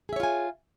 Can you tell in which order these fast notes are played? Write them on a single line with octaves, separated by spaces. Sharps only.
G#4 E5 C#5 F4 G#5